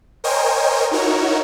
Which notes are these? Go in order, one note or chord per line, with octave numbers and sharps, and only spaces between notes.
A#4 C5 C#5 D#5 G5 G#5
D#4 E4 F#4 A#4 C#5